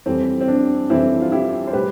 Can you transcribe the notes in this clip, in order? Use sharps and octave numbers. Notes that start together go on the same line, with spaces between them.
F2 E3 G3 C4
C4
D4
F2 E3 G3 C4 E4
F4
E4 G4
C5
A2 G3 G4 B4